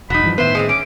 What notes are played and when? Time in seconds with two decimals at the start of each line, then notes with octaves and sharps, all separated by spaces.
0.10 E1 F#3 D#4 B5
0.24 G2 E3 F3
0.38 A2 D#3 B3 B4 C5 E5
0.55 G#3 A#3 C4
0.69 C#4 D6